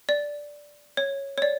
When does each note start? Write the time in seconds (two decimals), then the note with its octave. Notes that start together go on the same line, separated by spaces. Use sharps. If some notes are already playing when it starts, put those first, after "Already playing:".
0.09 D5
0.97 C#5
1.38 C#5
1.42 D5